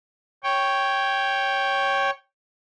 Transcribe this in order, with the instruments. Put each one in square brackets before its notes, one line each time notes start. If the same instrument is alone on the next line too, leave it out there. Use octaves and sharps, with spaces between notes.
[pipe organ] C#5 G5